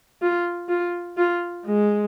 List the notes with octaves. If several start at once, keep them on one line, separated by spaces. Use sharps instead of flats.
F4
F4
F4
G#3